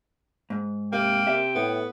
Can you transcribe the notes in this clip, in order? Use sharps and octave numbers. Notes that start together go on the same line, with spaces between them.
G#2
C3 A#3 G5
C3 E5
A2 B3